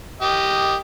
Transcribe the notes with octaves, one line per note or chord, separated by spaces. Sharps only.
G4 D#5